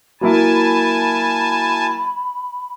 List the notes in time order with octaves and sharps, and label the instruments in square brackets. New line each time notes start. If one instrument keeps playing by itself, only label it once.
[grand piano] F#3 A#3 E4 [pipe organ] G#5 A5 [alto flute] B5